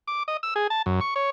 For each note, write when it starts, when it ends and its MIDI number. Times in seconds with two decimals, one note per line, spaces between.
0.08 0.23 86
0.28 0.37 75
0.43 0.54 88
0.56 0.67 68
0.70 0.82 81
0.86 1.00 42
1.01 1.14 85
1.16 1.30 73